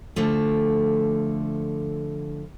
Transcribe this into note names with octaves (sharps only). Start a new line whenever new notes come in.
D3 F3 A3